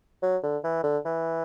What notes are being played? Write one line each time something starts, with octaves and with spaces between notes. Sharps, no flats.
F#3
D3
E3
D3
E3